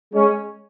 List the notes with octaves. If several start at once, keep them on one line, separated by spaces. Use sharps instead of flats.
G#3 C#4